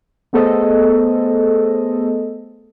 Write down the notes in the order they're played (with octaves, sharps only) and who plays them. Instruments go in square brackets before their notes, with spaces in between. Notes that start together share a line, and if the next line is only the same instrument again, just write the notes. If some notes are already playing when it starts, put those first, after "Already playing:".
[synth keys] A3 B3 G#4 A4 C5 D#5